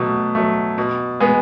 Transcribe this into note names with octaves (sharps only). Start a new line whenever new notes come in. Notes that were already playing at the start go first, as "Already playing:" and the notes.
Already playing: B2 F#3 A3
F#3 A3
B2
G#3 B3